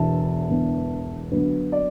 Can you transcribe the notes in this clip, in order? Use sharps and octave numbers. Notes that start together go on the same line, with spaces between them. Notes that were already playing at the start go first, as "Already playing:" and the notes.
Already playing: E1 E2 D3 B3 E5 A5
E1 E2 D3 B3
D2 D3 F#3 B3 B4
D5